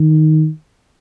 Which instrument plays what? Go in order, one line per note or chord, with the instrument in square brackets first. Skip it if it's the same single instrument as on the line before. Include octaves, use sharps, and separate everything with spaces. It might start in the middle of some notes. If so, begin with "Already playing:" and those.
Already playing: [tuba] D#3